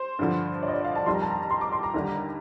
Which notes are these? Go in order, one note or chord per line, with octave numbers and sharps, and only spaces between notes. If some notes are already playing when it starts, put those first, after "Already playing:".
Already playing: C5
G2 D3 F3
D5
D#5
D5
F5
A5
F2 D#3 G3 C6
A#5
A5
A#5
C6
D6
C6
A#5
D#2 D3 G3